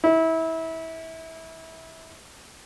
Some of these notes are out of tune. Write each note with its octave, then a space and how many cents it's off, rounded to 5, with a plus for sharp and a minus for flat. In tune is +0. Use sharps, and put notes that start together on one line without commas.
E4 -25